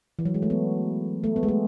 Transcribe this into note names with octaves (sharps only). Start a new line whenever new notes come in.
E3
F#3
G#3
A3
B3
A3
B3
G#3
A3